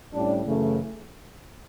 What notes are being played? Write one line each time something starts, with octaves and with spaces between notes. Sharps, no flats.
A2 G3 C#4 D4
F#2 C#3 E3 A3